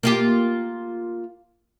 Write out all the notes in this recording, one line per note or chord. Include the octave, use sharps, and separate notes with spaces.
A#3 F4 G4